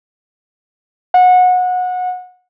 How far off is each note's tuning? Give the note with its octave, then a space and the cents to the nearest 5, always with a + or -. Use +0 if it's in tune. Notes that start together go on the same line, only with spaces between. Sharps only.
F#5 -25